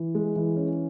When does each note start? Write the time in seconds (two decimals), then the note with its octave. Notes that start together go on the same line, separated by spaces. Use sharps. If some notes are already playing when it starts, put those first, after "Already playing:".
Already playing: E3
0.15 G#3
0.36 E3
0.56 C#4